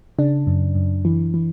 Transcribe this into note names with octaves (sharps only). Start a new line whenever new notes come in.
C#3 D4
F#2
F#2
E3
E3